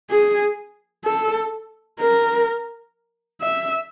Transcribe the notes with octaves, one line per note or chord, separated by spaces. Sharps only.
G#4
A4
A#4
E5